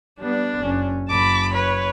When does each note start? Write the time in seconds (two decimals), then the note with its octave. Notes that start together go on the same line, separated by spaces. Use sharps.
0.20 G3 B3 D4
0.60 F#1 C#4
1.09 F#1 A5 B5 D6
1.54 B4 C#5